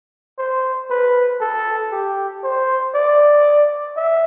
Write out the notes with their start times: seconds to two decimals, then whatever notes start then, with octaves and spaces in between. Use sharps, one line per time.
0.38 C5
0.90 B4
1.41 A4
1.92 G4
2.44 C5
2.95 D5
3.96 E5